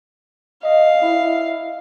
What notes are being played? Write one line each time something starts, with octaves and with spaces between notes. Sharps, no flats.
D#5 F5
E4